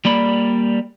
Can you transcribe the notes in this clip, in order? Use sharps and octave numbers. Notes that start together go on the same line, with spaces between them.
G3 A#3 D5 B5